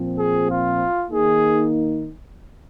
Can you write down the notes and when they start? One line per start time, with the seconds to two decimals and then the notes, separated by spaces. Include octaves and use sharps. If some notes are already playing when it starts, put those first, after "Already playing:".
Already playing: A#2 F3 C4
0.17 G#4
0.49 F4
1.10 D#3 A#3 D#4 G#4